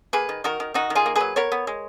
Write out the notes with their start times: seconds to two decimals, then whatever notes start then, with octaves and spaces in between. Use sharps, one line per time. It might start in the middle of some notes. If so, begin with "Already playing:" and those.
0.13 A#3 G#4 B4
0.29 D#3
0.44 D#3 F#4 A#4
0.60 D#3
0.74 D#3 D#4 F#4
0.90 D#3
0.95 F4 G#4
1.06 A#3
1.16 F#3 G#4 B4
1.36 B3 A#4 C#5
1.52 B3
1.67 G#3